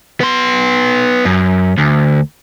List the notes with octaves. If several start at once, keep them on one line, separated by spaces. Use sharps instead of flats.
B3 C6
F#2
D2